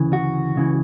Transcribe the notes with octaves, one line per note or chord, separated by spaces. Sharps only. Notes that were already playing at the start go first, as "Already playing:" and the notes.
Already playing: D2 C#3 E3
F#4
C#2 C#3 E3